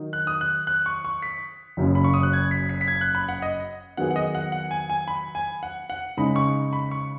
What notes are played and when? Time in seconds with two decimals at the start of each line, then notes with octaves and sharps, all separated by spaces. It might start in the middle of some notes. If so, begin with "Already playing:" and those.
Already playing: D#3 F#3 D#4
0.13 F#6
0.27 D#6
0.41 F#6
0.67 F#6
0.86 C#6
1.05 C#6
1.22 B6
1.77 F#1 F#2 C#3 F#3 C#4
1.95 B5
2.04 C#6
2.14 D#6
2.23 F#6
2.33 G#6
2.51 B6
2.69 B6
2.81 B6
2.88 G#6
3.01 F#6
3.15 B5
3.29 F#5
3.42 D#5
3.97 D#3 F#3 B3 G#4 F#5
4.11 F#5
4.16 D#5
4.35 F#5
4.52 F#5
4.71 G#5
4.90 G#5
5.08 B5
5.35 G#5
5.63 F#5
5.90 F#5
6.17 C#3 G#3 D#4 B5
6.36 C#6
6.73 B5
6.91 C#6